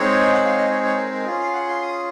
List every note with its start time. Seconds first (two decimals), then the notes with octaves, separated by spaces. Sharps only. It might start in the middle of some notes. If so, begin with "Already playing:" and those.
Already playing: G#3 C4 D#4 G#4 C#5
0.32 F#5
0.45 F5
0.57 D#5
0.70 C#5
0.83 C#5
0.97 A#4
1.12 A#4
1.25 C#4 F4 G#4
1.40 F5
1.53 F#5
1.68 C6
1.82 D#6